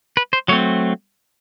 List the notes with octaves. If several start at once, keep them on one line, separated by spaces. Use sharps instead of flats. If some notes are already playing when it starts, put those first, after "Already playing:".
B4
C5
F#3 A3 C4 C#5